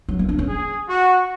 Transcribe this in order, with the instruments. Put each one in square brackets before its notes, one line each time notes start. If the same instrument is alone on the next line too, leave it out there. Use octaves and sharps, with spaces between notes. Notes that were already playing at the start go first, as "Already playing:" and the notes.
[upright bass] F#3
B3
D4
C#4
[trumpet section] G#4
F#4